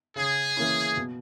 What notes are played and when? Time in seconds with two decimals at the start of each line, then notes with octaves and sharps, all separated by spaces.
0.16 C#3 G#4
0.56 E3 A#3 C#4 E4
0.97 B2